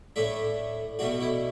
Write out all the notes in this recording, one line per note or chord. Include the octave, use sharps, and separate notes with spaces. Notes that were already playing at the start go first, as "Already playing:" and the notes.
A2 A3 D4 E5
B2 A3 D4 F#4
E4